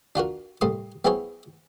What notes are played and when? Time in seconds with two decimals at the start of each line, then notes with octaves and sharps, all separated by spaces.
0.15 D4 F4 F#4 A#4
0.61 C2 A2 C6 D#6
1.05 B3 C4 E4 G#4 C5 C#5